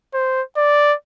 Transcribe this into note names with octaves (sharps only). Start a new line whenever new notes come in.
C5
D5